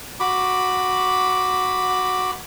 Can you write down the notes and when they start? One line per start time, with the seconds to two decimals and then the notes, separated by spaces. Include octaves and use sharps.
0.20 F#4 B5 D6